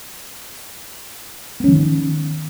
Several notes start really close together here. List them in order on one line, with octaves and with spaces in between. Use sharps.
B3 C#4 E3 D#3